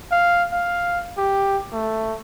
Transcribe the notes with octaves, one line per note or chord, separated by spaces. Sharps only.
F5
F5
G4
A3